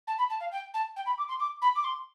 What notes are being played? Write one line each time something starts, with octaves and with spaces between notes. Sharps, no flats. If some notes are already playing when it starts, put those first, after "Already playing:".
A5
B5
A5
F5
G5
A5
G5
B5
D6
C6
D6
B5
D6
C6